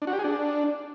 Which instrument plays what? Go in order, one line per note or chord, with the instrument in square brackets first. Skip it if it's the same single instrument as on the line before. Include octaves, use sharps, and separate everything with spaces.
[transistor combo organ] D4
F#4
G4
G#4
D4